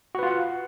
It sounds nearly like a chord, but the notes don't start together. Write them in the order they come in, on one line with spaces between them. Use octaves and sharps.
F#4 B4 F4 F#5